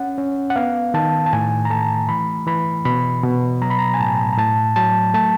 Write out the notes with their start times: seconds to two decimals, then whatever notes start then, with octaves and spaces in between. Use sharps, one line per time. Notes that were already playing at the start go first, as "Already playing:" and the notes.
Already playing: C#4 F#5
0.18 C#4
0.50 F#5
0.56 B3 F5
0.94 D#3 A5
1.26 A5
1.33 A2 G#5
1.65 A#5
1.70 A3 A5
2.09 E3 B5
2.46 E3 B5
2.85 B2 B5
3.23 B2
3.62 F#3 A#5
3.70 B5
3.79 A#5
3.94 G#5
4.00 A2 A5
4.33 A#5
4.38 A2 A5
4.76 F#3 A5
5.14 A3 A5